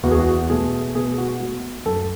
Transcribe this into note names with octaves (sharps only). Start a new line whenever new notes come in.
E2 F#4
G#4
F#4
B2 A3 G#4
B2 G#4
F#4
A3 F#4
F#2 A4